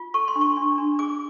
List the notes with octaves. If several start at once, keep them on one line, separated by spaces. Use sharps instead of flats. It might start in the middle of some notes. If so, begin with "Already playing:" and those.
Already playing: F4
A4 C#6
C6
D4
C#6
D4
D4
G#4 D6